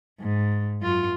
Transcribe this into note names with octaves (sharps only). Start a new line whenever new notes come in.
G#2
F#2 F4